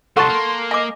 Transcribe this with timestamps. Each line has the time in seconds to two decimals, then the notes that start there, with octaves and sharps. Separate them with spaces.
0.17 C2 F#3 A4 F#5 A5 C6 C#6
0.28 A#3
0.71 D#5 G#5 D6